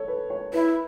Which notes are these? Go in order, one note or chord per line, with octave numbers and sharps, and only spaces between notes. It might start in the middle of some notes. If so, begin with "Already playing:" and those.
Already playing: A4 C#5
B4
C#5
E4 B4